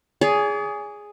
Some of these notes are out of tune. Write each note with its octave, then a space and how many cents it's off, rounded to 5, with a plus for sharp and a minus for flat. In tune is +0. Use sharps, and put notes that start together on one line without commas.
G#4 +0 D5 -45